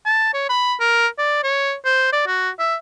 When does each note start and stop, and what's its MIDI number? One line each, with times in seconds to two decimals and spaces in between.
0.06 0.31 81
0.34 0.45 73
0.49 0.74 83
0.80 1.07 70
1.18 1.40 74
1.43 1.73 73
1.85 2.09 72
2.13 2.22 74
2.27 2.50 66
2.59 2.75 76